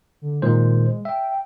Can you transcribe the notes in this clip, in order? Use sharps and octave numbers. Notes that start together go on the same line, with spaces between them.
D3
A#2 D#3 G#3 C5
E5 G5